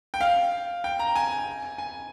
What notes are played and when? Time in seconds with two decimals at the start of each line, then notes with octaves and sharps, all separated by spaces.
0.14 G5
0.21 F5
0.84 G5
0.99 A#5
1.16 G#5
1.78 G#5